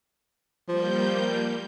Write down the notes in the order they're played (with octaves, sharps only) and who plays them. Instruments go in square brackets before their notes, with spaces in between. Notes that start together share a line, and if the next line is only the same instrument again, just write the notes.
[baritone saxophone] F3 [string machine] G3 A#3 G6